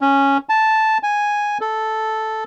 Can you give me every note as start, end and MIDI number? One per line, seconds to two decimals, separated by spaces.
0.01 0.38 61
0.49 0.98 81
1.03 1.58 80
1.61 2.44 69